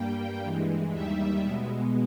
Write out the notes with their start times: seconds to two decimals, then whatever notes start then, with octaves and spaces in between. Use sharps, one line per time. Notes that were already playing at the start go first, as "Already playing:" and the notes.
Already playing: G2 G3 A#3 G5
0.42 G2 E3 G#3
0.92 D#2 D#3 G3 E5
1.43 B2 G#3 B3